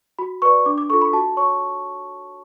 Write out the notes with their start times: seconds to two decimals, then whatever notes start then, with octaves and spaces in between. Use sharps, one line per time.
0.19 F#4 B5
0.42 B4 D5 C#6
0.66 D4 D6
0.78 D6
0.90 F4 A4 C#6
1.01 B5
1.13 F#4 A5
1.37 C#5 C#6